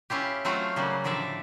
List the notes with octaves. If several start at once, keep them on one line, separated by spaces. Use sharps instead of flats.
C#4 E4 F4 G4
F#3 A3 C4 F4 F5
C#3 F#3 G3 A#3
A2 D3 F3 D5 E5